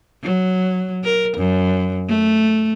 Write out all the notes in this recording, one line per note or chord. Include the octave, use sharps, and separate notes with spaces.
F#3
A#4
F#2
A3